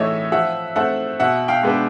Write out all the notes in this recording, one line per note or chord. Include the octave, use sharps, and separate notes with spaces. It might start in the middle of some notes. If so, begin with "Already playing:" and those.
Already playing: A2 E3 A3 C#5 D#5 E5
F3 E5 F#5
A3 C4 E5 F#5
B2 E5 F#5
F5 G5
G#3 B3 D4